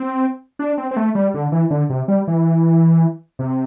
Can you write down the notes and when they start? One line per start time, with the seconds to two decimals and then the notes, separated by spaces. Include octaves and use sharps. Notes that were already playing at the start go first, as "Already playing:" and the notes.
Already playing: C4
0.59 D4
0.78 C4
0.91 C4
0.97 A3
1.15 G3
1.34 D3
1.52 E3
1.70 D3
1.90 C3
2.08 G3
2.27 E3
3.39 C3